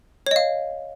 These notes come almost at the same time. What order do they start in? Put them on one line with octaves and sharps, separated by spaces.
C#5 D#5 F5